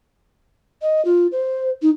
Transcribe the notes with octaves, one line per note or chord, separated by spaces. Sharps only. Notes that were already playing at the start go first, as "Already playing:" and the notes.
D#5
F4
C5
D#4